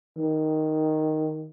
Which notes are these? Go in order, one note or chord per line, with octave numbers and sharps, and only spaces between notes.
D#3